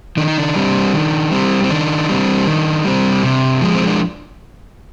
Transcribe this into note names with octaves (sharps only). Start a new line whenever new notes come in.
D#3 D4
D#4
D4
G3 C4
D#3
G3 C4
C4
D#3 D4
G3 C4
D#3
G3 C4
C3
F3 G#3
C4
D4